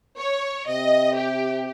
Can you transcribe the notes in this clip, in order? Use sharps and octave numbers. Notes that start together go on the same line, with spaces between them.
C#5
C3 D#5
G4